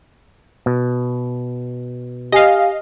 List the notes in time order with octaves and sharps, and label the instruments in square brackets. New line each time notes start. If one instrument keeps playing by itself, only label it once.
[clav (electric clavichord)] B2
[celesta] G4 G#5 [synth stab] D#5 F5